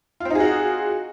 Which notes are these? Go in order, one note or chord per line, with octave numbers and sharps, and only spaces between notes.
C4 D#4 F4 F#4 G#4